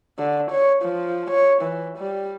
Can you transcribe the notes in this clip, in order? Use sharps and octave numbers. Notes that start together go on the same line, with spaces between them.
D3
C#5
F3
C#5
E3
G3